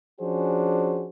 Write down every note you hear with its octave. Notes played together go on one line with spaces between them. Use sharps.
F3 C#4 D4 F#4 G#4 C5